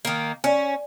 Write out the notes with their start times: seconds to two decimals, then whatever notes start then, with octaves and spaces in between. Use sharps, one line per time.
0.05 D#3 A#3
0.44 C#4 D5 G#5